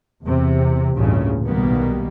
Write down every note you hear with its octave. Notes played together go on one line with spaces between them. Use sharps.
E2 C3
A1 D2 G2 A#2 C#3
B1 B2 D#3 G3 A#3 B3